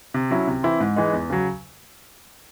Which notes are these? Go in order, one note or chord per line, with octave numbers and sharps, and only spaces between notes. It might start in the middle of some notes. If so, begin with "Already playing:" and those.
C3
F#3 C#4 E4
C3
E3 C4 E4
G#2
E3 G#3 D#4
E2
C#3 F#3